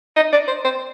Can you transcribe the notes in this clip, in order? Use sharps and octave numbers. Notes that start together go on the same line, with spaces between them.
D#5
D5
C5
C5